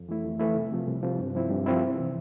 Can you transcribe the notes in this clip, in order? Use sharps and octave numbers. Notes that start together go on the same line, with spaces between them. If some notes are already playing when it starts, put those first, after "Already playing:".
Already playing: F2
E3 A3 E4
F2
E3 A3 E4
C2
C3 F3
C2
C3 F3
G2
F3 C4 E4
G2
F3 C4 E4
C2
C3 E3